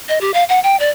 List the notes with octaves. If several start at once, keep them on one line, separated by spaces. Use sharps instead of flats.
D#5
G4
F5
F#5
G5
D5